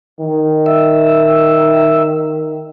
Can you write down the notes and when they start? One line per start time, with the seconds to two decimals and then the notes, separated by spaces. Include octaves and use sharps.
0.20 D#3
0.66 E5